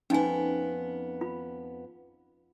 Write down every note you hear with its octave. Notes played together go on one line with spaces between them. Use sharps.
F2 B3 C#4 D#4 G#5
F4 B5